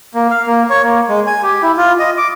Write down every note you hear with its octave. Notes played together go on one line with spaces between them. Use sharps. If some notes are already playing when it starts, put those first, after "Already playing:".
A#3
F5
A#3
C#5
A#3
G#3
G#5
G4
E4
F4
D#5
D6